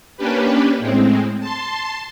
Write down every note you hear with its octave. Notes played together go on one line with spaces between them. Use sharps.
A#3 C#4 D4 G4 B4
A2 G#3 C4
A5 C6